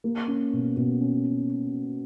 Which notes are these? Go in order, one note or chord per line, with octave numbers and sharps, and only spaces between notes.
A#3
C#4
B2
B2
C#4